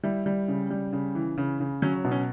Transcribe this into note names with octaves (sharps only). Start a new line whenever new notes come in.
G3 E4
G3
C#3
G3
C#3
E3
C#3
C#3
F#3 C#4
B2
C#4